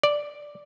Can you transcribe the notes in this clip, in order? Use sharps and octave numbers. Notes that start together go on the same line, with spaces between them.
D5